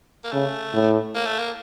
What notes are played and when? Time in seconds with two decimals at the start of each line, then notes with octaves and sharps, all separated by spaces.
0.24 A#3
0.32 C#3 A3
0.73 A2
1.15 A#3
1.26 A3
1.39 A#3